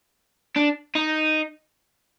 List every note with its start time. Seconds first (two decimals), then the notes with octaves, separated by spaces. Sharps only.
0.56 D4
0.95 D#4